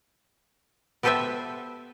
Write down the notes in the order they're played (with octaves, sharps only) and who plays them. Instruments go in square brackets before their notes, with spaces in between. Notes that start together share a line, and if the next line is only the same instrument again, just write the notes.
[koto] B3 G4 A4 B4 C5 E5